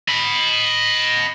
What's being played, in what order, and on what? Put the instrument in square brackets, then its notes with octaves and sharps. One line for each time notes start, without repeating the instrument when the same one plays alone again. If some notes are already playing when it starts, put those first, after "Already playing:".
[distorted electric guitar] D#5 B5